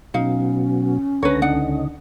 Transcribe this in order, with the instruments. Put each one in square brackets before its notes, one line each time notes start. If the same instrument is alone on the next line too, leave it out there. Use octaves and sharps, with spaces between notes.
[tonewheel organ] B2 F#3 [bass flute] C#4 [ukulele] D#4 F5
[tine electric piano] C#2 D3 [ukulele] B4 C#5 [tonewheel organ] A#5
[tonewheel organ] C#3 D#4 [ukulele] D4 F#5